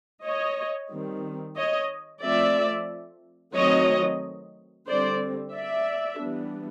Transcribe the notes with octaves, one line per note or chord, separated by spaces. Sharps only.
C#5 D#5
D#3 G3 C4
C#5 D#5
F3 A3 C4 D5 E5
D#3 F#3 A3 C4 C#5 D#5
D3 G3 C4 C5 D5
D5 E5
E3 G3 B3 D4